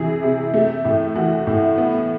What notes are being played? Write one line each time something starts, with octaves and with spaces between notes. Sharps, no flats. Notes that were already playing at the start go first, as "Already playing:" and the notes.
Already playing: C3 E3 G#4
C3
A3
A2
E3 F#4
A2
B3